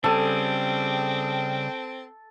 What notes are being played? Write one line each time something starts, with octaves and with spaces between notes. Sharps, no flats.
C#3 G3 C4 G#4 A4 G5